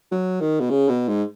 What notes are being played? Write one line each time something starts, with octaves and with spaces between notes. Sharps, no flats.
F#3
D#3
B2
C#3
B2
G#2